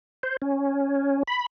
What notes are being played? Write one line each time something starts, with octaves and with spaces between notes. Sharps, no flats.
C5
C#4
B5